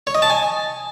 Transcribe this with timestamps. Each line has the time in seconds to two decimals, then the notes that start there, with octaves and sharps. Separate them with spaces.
0.07 C#5
0.15 D#5
0.22 A5
0.30 G#5